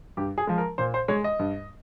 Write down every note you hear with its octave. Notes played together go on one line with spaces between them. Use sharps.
G2 G4
G#4
F3 G#3
A#4
A#2 C5
C5
G#3 C#5
D#5
G2